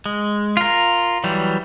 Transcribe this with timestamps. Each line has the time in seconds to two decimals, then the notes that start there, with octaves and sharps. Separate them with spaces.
0.06 G#3
0.57 F4 A#4
1.24 E3 F#3 G3